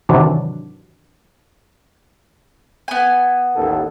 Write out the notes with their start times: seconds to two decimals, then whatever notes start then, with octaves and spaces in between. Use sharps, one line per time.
0.09 G#2 C3 D#3 E3 F#3 D4
2.88 B3 G#5
3.56 A1 D#2 A4